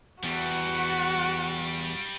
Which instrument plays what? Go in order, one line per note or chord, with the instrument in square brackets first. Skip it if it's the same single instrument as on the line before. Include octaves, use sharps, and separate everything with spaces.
[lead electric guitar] E2 [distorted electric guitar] F3 G3 [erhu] F#4 [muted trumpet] F#5